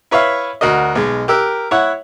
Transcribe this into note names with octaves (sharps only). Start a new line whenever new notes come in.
E4 B4 C#5 E5 F5
D2 F#4 A#4 D#5
B1 G#3
G4 A#4 E6 F#6
E4 C#5 F#5